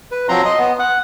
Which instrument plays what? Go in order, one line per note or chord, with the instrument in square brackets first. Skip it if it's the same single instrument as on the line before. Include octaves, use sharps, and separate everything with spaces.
[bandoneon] B4
F3 F#3 C4 A#5 C6
D#5 C6
B3
F#5